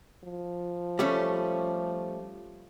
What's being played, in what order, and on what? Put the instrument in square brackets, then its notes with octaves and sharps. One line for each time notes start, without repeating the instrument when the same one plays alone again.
[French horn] F3
[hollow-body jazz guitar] G3 A3 C#4